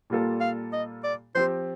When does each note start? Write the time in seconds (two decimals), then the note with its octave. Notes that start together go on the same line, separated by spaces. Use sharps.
0.10 A#2 G3 A#3 F4 A4
0.41 F5
0.73 D#5
1.04 D5
1.35 F3 C4 G4 C5